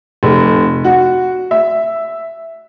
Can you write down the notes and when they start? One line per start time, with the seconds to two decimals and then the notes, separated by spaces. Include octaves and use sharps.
0.23 F1
0.84 F#4
1.51 E5